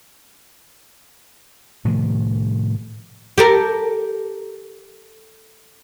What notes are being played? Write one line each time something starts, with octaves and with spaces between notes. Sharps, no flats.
A2 C3 D#3 F3
G4 A4 A#4